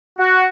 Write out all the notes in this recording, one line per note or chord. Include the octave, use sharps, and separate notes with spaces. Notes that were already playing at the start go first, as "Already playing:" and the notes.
F#4